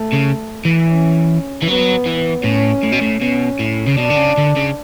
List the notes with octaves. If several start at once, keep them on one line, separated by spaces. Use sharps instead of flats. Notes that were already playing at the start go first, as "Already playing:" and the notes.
Already playing: A3
C#3
E3
C#4
E3
F#3 B3
E3
A2 C#4
A2
B2
A2
B2 C#4
A2
C#3
B2 D4
D3
C#3
D3
C#3